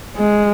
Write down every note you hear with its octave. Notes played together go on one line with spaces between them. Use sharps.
G#3